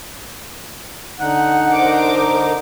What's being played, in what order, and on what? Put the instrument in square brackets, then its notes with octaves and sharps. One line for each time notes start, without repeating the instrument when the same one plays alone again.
[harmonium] D3 D#4 [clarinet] F#5
[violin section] A#4 C5 D6